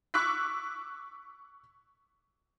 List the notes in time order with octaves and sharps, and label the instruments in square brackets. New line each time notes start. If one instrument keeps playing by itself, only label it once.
[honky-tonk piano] C#6 D6 E6 F#6 B6